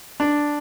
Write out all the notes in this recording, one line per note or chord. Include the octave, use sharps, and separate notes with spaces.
D4